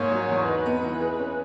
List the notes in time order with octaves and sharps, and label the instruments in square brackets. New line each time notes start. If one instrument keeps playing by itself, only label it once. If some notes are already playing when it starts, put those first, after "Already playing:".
Already playing: [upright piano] G#2 A#3 [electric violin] C#5
[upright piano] F#3
E2
[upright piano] D#4 [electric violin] B4
[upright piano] B3
E3
G#4
C#4